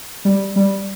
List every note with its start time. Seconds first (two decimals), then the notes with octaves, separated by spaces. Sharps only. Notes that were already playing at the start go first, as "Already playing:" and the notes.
0.25 G3
0.56 G3